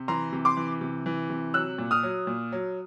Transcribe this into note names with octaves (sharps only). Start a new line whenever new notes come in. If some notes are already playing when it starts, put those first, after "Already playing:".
Already playing: C3
E3 A#5 C6
C3
C6 D6
E3
C3
E3
C3
F#3 E6 F#6
A#2
D#6 F6
F#3
A#2
F#3